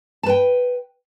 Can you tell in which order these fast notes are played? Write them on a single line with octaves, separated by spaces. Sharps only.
A5 B4 G5